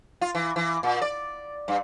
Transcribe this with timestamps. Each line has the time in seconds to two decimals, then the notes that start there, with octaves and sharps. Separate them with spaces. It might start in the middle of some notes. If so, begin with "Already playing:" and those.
0.21 F4
0.35 E3
0.56 E3
0.83 A#2
1.02 D5
1.68 G2